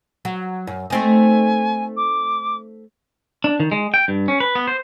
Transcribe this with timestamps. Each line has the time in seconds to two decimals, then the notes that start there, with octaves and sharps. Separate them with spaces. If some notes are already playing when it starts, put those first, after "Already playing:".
0.25 F#3
0.67 F#2
0.90 A3 C4 D#4 G#5
1.97 D6
3.44 D4
3.60 D#3
3.72 G#3
3.94 G5
4.08 G2
4.28 C#4
4.40 B4
4.55 B3
4.67 C5